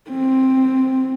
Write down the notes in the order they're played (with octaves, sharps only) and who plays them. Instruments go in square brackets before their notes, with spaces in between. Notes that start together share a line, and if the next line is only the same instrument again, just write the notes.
[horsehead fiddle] C4